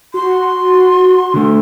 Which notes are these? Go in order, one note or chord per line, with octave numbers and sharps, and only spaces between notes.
F#4 C6
D3 A3